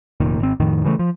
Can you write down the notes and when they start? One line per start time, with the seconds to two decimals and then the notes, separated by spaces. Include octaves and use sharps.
0.20 F1 A#2 D#3
0.39 G#1 C4
0.60 F2 A2 D#3
0.84 C#3 E3 G3 A3
0.99 F3